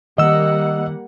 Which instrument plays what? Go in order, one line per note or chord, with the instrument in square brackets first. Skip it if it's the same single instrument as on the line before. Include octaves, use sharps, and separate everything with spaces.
[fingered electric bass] D#3 [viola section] G3 A#3 F#5 [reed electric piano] D#5 E6